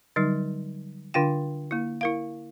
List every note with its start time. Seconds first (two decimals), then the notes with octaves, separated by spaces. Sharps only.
0.16 D3 F#3 G3 D#4
1.14 D3 D4 F4 F5 G5
1.71 A#3 E4
2.01 E4 A#4 F5